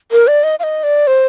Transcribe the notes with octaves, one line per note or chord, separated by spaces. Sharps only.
A#4
D5
D#5
F5
D#5
D5
C5